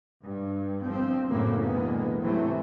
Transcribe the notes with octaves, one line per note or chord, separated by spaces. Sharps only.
G2
G1 F3 C4
F#2 A2 C#3 E3 F#3 A#3
D2 B2 E3 G#3 A#3 B3
G#2 C3 E3 F#3 A3